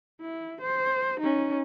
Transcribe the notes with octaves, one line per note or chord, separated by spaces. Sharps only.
E4
C5
C#4 D#4